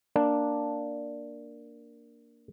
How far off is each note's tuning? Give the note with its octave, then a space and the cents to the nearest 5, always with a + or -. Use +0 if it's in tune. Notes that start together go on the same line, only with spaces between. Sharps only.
A#3 +0 D4 +0